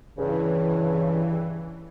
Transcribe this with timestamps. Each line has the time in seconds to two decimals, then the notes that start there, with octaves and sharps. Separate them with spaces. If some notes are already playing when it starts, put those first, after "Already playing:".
0.18 G2 C#3 E3